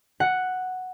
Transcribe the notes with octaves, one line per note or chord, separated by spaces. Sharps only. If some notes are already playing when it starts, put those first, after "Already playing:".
F#5